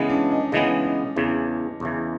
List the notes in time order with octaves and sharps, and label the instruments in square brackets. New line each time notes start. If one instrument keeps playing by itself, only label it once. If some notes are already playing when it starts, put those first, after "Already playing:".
Already playing: [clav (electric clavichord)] C#3 E3 G#3 B3 [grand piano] C#4
[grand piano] D4
D#4
[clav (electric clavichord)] C#3 E3 G#3 B3 [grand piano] D#4
[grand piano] D#4
[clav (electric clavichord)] E2 C#3 E3
E2 C#3 E3